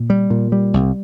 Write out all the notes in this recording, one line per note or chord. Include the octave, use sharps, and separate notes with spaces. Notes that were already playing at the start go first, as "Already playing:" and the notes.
Already playing: A#2
G3
A#2
G3
C2